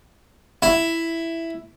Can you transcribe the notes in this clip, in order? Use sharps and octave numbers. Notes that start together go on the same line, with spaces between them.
E4